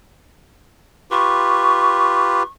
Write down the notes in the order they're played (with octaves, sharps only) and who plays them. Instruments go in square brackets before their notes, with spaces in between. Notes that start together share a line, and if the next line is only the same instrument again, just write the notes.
[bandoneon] F4 G4 B4 [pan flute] C#6